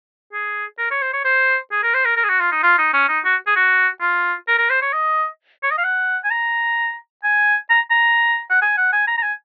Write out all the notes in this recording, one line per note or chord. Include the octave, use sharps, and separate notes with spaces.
G#4
A#4
C#5
C5
C#5
C5
G#4
A#4
C5
A#4
A#4
G#4
F#4
F4
D#4
F4
D#4
C#4
D#4
F#4
G#4
F#4
F4
A#4
A#4
C5
C#5
D#5
C#5
D#5
F5
F#5
G#5
A#5
G#5
A#5
A#5
F#5
G#5
F#5
G#5
A#5
A#5
G#5